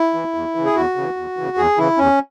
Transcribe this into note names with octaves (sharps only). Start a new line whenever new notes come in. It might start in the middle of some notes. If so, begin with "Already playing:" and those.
Already playing: E4
E3
E2
C#3 E3
G#4
E2 F#4
C#3 E3
E2
C#3 E3
E2 G#4
C#3 E3 E4
E2 C#4